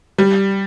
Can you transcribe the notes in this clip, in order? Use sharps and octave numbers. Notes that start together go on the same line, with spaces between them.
G3